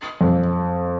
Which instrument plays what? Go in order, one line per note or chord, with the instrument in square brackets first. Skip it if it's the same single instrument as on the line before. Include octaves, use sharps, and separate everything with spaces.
[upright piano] F2